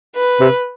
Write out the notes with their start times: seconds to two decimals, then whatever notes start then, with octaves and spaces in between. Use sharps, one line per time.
0.16 B4
0.40 C3